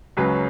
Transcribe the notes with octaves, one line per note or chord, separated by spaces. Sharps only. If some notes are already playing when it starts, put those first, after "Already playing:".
C#2 C#3 F#3 B4